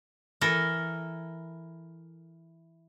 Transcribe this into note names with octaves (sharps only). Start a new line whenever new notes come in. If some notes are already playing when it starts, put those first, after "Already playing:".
E3 A4 A#4